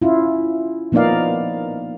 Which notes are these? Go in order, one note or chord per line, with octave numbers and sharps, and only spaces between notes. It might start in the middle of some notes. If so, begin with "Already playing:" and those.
C#4 E4 F4
F3 A#3 B3 D#4 D5 F5